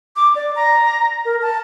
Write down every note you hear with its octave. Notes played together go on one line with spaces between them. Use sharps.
D6
D5
A#5
A#4
A5